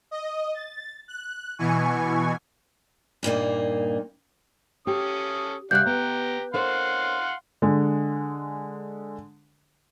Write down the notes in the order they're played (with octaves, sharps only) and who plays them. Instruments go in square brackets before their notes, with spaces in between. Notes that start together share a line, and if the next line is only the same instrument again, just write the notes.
[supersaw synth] D#5
A6
F#6
B2 E3 G#5 C#6
[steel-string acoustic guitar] G2 A#2 A#3 D#4
[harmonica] C#4 A4 D#6 [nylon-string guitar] G4
[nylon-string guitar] C3 G3 F5 [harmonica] D4 F#5 [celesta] F#6 G6
[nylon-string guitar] B3 [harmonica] G4 A#5
[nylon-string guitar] A#4 C5 C#5 [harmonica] F5 F#5 C6
[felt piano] D3 G#3